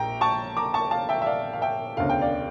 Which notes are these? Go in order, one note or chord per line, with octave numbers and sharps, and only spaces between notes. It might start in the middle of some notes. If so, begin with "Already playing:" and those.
Already playing: A#1 G5 A#5
A5 C#6
A#5 D6
A5 C#6
F5 A5
E5 G5
E5
D5 F5
F5
E5 G5
E1 D2 C#3 F5
G5
D5 F5